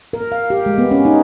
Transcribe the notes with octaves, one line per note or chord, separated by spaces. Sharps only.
A#4
F5
G4
G#3
B3
C#4
D#4